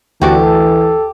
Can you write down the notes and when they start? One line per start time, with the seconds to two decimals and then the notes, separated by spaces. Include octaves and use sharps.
0.21 D2 E3 F#4 G4 A4 D5